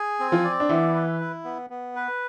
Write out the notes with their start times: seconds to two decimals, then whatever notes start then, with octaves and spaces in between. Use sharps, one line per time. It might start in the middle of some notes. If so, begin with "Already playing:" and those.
Already playing: G#4 G#5
0.20 C4
0.32 F3 F4
0.44 D5
0.60 D4
0.69 E3 B3 E4
0.94 B4
1.20 E4
1.45 B3
1.70 B3
1.96 B4